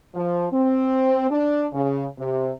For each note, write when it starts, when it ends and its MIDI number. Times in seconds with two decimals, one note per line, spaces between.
0.15 0.46 53
0.52 1.28 60
1.30 1.65 62
1.72 2.05 49
2.18 2.50 48